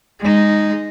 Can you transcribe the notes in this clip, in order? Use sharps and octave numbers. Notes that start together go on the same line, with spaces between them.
G#3 D#4